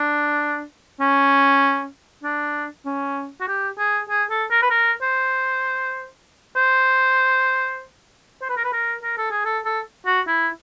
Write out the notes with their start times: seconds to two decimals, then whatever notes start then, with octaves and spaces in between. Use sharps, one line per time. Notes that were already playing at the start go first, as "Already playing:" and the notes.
Already playing: D4
1.00 C#4
2.23 D4
2.85 C#4
3.41 F#4
3.47 G4
3.78 G#4
4.09 G#4
4.30 A4
4.51 A#4
4.62 B4
4.71 A#4
5.02 C5
6.56 C5
8.42 C5
8.49 B4
8.57 A#4
8.64 B4
8.72 A#4
9.03 A#4
9.17 A4
9.31 G#4
9.45 A4
9.65 A4
10.06 F#4
10.27 E4